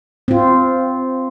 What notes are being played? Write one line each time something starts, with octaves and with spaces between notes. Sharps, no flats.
C4 F4